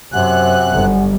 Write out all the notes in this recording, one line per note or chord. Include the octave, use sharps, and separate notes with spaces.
F#2 C3 C5 F#5 G#5 F#6
G1